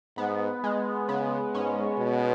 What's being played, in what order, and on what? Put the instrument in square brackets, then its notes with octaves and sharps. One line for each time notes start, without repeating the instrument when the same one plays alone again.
[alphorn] G#2 [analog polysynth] B3
[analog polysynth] G#3
[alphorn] C#3 [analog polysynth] B3
[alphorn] G#2 [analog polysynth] C#4
[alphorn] B2